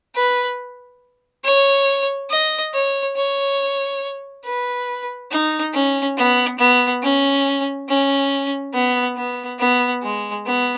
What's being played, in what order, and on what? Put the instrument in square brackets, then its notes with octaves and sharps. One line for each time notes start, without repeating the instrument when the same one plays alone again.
[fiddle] B4
C#5
D#5
C#5
C#5
B4
D#4
C#4
B3
B3
C#4
C#4
B3
B3
B3
G#3
B3